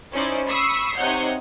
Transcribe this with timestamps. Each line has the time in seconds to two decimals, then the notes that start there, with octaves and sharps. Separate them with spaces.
0.12 C#4 D#4 E4 C5 D5
0.46 B5 C#6 D#6 E6 B6 C7
0.97 C3 D#4 C#5 F#5 G6